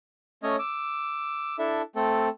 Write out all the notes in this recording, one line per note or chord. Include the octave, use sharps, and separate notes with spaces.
A3 C#4 C#5 D#5
D6 E6
D4 E4 A4 E5
A3 C4 A4